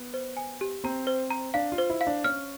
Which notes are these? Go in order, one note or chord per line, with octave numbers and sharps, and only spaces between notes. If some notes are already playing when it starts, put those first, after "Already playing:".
Already playing: B3
C5
G#5
G4
C4 A#5
C5
A#5
D4 F5
F4
C5
E4
F5
D4
C#4 F6